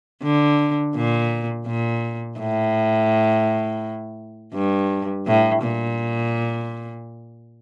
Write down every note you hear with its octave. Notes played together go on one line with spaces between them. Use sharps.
D3
A#2
A#2
A2
G2
A2
A#2